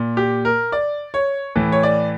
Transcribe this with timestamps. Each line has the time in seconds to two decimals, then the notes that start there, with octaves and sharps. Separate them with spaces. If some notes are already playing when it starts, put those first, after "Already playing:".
Already playing: A#2
0.17 G4
0.45 A#4
0.72 D5
1.14 C#5
1.56 A2 E3
1.72 C#5
1.83 D5